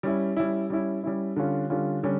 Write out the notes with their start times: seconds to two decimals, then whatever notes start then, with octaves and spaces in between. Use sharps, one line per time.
0.03 G3 C#4 E4
0.37 G3 C#4 E4
0.70 G3 C#4 E4
1.04 G3 C#4 E4
1.36 D3 G3 C#4 F4
1.70 D3 G3 C#4 F4
2.03 D3 G3 C#4